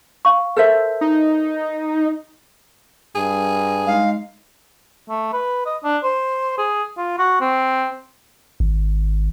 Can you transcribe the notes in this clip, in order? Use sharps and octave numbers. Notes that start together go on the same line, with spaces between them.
F5 C#6
A4 A#4 C5 E5
D#4
G2 G#4
G#3 D#4 F5
A3
B4
D#5
D4
C5
G#4
F4
F#4
C4
G#1